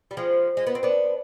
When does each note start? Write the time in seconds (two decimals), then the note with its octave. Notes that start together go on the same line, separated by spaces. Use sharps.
0.11 G3
0.17 F3 G#3
0.57 G#3
0.67 B3
0.75 C4
0.83 B3 D4